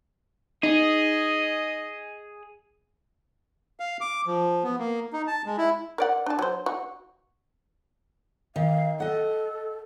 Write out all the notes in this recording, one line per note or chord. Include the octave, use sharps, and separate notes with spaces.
D#4 G#4 D#5
F5
D6
F3
B3
A#3
D#4
A5
G#3
E4
A#4 D5 F#5
D4 A5
F#3 C5
F#4
D#3 F5
A4 D#5 F#5